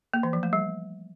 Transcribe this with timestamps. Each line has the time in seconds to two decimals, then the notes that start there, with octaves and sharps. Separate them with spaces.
0.14 A#3
0.23 E3
0.33 F3
0.43 A3
0.53 G3